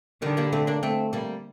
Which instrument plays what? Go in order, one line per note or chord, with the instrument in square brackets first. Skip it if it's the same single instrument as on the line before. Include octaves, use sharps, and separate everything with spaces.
[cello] D3 [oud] D#3 G3
[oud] G3 A#3
A3 C4
A#3 D4
A3 C4
G3 A#3